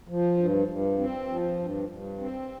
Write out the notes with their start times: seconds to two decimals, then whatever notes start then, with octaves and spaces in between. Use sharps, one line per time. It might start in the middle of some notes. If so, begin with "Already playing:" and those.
0.08 F3
0.37 G2
0.67 G2
0.99 C4
1.28 F3
1.59 G2
1.89 G2
2.19 C4